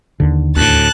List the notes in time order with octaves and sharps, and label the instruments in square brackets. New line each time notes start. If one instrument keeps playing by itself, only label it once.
[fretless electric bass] D#2 D3
[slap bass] D2 A2 [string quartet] A5 F#6